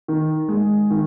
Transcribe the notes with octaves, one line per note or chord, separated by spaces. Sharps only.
D#3
G#3
D#3